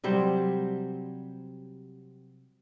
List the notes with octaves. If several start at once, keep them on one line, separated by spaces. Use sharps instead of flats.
C3 F#3 G3 C4